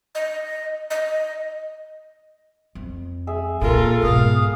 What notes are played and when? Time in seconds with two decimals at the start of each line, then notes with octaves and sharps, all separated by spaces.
0.15 D#5
0.90 D#5
2.75 F2
3.27 G#4 E5
3.61 F2 A#2 F4 A4 A#4
4.02 G#2 B2 F5 D#6